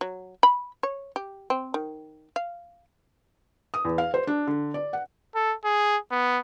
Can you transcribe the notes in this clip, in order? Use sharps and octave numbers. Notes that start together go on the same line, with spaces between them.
F#3
B5
C#5
G4
C4
D#3
F5
D#6
E2
F5
C5
D4
D3
D5
F#5
A4
G#4
B3